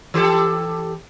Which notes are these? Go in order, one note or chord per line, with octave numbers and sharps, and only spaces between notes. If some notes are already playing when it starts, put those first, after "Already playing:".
E3 G4 A4